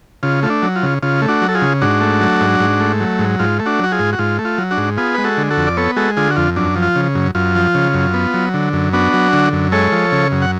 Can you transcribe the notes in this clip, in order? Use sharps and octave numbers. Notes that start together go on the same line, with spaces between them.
C#3 F4
A3 F4
D4
F#3
F4
C#3
C#3 F4
A3
D4 F#4
F#3
A4
F4 G#4
C#3
G#2 D4 F#4
A3
F#3
G#2
G#2
A3
F#3
G#2
G#2 F4
A3
D4 F#4
F#3 F#4
F4 G#4
G#2
F#4
G#2 F4
A3
F4
F#3
D4 F#4
G#2
B3 F4 G#4
G#3 B4
F#4 A4
D3
F#4 A4
F2
D5
B3 A4 C#5
G#3 F#4 A4
D3 F4 G#4
F#4
F2 F4
F#2 D4
F3
F4
C#3
F#2
F#2 F4
F3
C#3
F#2
B3
F#3
D3
F#2
B3 D4 F#4
F#3
D3
F#2
G#3 A4 C#5
F3
C#3
F#2
F#5